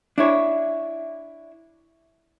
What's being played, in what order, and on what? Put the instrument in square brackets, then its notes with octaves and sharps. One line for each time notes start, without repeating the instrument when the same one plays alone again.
[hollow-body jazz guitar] D4 E4 C#5